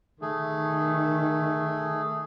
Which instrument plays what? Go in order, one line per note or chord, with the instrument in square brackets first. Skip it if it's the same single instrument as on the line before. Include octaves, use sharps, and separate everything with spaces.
[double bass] D#3 [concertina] A3 G#4